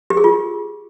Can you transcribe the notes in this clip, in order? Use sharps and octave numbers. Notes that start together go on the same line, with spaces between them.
G4
G#4
F4